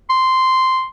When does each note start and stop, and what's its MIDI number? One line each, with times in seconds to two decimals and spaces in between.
0.10 0.85 84